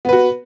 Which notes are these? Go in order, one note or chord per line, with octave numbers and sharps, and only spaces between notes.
B3 F#4 B4